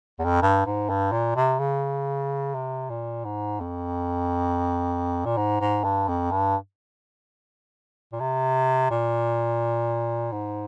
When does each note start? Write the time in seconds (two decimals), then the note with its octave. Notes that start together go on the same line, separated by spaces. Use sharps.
0.19 E2
0.25 F2
0.42 G2
0.65 G#2
0.89 G2
1.12 A#2
1.36 C3
1.59 C#3
2.55 C3
2.90 A#2
3.25 G#2
3.60 F2
5.26 A#2
5.37 G#2
5.60 G#2
5.84 G2
6.08 F2
6.32 G2
8.13 A#2
8.20 C3
8.91 A#2
10.32 G#2